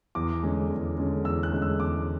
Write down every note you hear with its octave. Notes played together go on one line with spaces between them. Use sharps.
E2 D6
D3 G#3 C#4
E2
D3 G#3 C#4
E2 E6
F#6
D3 G#3 C#4
E6
E2 D6